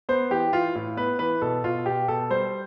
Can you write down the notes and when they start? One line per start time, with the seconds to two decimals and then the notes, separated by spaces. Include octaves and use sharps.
0.09 B3 C5
0.31 E3 G4
0.53 E3 F4
0.75 A2
0.97 B3 B4
1.19 E3 B4
1.42 B2 A4
1.64 B2 F4
1.86 B2 G4
2.08 B2 A4
2.30 G3 C5